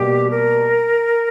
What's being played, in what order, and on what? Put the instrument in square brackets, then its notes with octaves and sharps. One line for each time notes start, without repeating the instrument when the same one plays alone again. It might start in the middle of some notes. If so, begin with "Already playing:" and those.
Already playing: [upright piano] B2 G3 A#3 [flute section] G4
[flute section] A#4